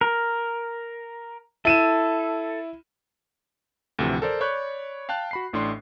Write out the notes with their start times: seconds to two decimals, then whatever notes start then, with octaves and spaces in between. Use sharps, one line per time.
0.01 A#4
1.65 E4 A4 D#7 E7
3.99 D2 A2 C3 E3 F3
4.22 A4 A#4 C5 D5
4.41 C#5 D5 B5 C#6 F#6 G6
5.09 F5 G5 A5 F#6
5.31 F#4 B5 C7
5.53 A1 A2 D4 C6